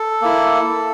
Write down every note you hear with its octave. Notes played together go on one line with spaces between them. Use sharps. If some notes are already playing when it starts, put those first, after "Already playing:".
Already playing: A4
A#3 E4